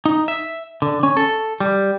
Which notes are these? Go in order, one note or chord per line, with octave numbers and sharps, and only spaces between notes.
D#4
E5
D3
C#4
A4
G3